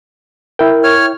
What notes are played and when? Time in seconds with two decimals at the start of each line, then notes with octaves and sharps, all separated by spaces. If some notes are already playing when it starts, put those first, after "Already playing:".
0.59 E4 A#4 G5
0.84 C#5 F6